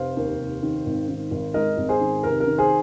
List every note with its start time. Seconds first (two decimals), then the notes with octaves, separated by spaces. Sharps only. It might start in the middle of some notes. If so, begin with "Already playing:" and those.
Already playing: F1 C5 F5
0.17 D#2
0.39 F1
0.63 D#3
0.86 G#1
1.09 D#3
1.31 G#1
1.54 G#2 A#4 D#5
1.78 G#1
1.89 G#4 C5
2.01 D#3
2.23 F1 A#4
2.40 A#4
2.47 D#3
2.58 G#4 C5